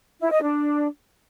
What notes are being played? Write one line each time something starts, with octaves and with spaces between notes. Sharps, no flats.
E4
D#5
D4